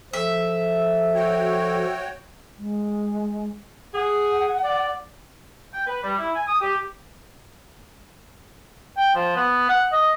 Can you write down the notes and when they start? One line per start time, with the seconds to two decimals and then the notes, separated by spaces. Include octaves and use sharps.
0.13 F3 A4 E5
1.15 F#4 C#5 G5
2.58 G#3
3.94 G#4 F#5
4.62 D5
5.73 G5
5.86 B4
6.04 G3
6.18 E4
6.35 G#5
6.48 D#6
6.61 G4
8.97 G5
9.15 F3
9.35 B3
9.69 F#5
9.92 D#5